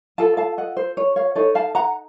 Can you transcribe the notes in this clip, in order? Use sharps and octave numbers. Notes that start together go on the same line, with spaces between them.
F4 A4 F5 A5
F5 A5
D#5 F#5
C5
C#5
C#5 F5
D#4 A4 C#5
F5 A5
F#5 A#5